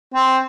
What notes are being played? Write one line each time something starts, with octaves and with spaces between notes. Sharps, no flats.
C4